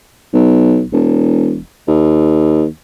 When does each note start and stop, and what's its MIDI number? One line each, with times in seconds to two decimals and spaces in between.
0.34 0.83 35
0.93 1.59 28
1.88 2.65 39